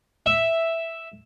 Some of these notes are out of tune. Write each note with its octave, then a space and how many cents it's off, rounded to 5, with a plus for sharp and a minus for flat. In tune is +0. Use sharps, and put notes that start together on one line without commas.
E5 +0